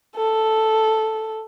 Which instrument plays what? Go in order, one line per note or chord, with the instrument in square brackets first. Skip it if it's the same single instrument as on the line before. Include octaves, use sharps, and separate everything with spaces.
[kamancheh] A4